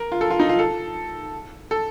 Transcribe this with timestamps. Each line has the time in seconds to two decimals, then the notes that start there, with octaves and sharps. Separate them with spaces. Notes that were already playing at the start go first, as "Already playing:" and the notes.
Already playing: A#4
0.12 F4
0.21 A4
0.30 F4
0.40 D#4
0.49 F4
0.59 A4
1.71 A4